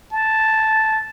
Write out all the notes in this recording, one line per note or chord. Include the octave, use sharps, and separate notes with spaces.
A5